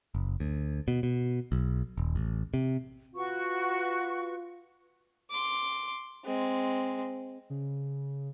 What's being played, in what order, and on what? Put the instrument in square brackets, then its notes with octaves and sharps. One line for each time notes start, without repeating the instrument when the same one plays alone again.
[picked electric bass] F#1
D2
B2
B2
B1
D#1
A1
C3
[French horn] F4 [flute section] F#4 B4 C#6
[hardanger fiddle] C6 D6
G#3 C4
[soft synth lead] C#3